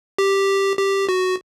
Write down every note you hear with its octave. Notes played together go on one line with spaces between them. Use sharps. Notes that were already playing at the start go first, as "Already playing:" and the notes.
G4
G4
F#4